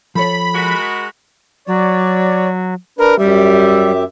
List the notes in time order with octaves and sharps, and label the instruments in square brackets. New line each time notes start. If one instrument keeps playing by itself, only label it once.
[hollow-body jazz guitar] F3 A4 C#5 [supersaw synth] B5
[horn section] G#3 F#4 A#4
[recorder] F#3 [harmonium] C#5 D5
[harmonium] D4 B4 [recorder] A#4
[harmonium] F#2 G4 E5 [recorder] G3